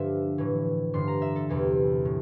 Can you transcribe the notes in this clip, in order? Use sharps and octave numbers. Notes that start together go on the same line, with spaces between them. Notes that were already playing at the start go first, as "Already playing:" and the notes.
Already playing: G2 D3 F3 E5
A2 E3
G2 D3 F3 C6
A#5
E5
A4
E2 C3 E3
A2